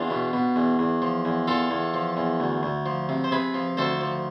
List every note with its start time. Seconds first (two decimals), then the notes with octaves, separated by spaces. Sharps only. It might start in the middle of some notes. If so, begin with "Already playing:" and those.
Already playing: E2 D4 F4
0.10 B2
0.33 B2
0.56 E2
0.79 E2
1.02 F3
1.25 E2
1.48 E2 F4 A4
1.71 E2
1.94 F3
2.17 E2
2.40 D2
2.63 D2
2.86 F3
3.09 C3
3.24 C5
3.31 C3 G#4 B4
3.54 F3
3.77 D2 A4 C5
4.01 F3